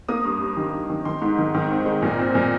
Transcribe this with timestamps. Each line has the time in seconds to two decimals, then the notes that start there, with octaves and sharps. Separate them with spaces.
0.09 A#3 D#6
0.25 G2
0.41 G2
0.57 D#3
0.74 G2
0.90 D#3
1.05 D#3 C6
1.22 G#2
1.38 D#3
1.55 D#3
1.71 C4
1.86 G#3
2.02 A#2
2.19 C4
2.35 A#2